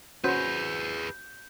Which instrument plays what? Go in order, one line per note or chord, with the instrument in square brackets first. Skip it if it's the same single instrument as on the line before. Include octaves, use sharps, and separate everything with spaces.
[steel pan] C#4 F#4 C5 [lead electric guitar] G#4 B4 [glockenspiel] G6